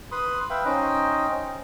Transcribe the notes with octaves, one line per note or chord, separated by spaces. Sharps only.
B4 B5 C6 D#6
B4 E5 F5 G5
C#4 D#4 C5 D#5 G5